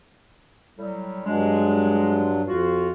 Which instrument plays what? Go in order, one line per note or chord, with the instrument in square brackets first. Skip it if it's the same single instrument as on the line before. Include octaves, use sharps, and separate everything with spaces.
[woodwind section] A2 F#3 G3
[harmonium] G2 F#3 D4 [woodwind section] G#3
[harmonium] F2 [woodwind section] F4 F#4